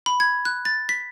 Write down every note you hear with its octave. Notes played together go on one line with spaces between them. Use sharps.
B5
G#6
F#6
A6
B6